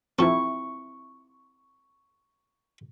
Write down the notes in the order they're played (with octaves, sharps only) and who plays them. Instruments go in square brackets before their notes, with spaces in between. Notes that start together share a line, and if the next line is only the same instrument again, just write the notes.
[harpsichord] F3 A4 [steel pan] C4 E4 [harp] C#6